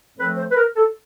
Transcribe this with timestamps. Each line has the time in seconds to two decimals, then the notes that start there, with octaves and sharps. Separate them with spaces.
0.18 A2 F3 A3 C4 B4
0.37 C5
0.51 B4
0.57 A#4
0.76 A4